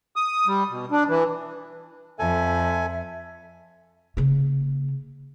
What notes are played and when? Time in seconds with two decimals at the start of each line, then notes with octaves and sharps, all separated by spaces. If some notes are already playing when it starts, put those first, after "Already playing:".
0.16 D#6
0.47 G3
0.70 B2
0.91 D4
1.09 E3
2.19 F2 A4 E5 G#5
4.17 C#3 A#3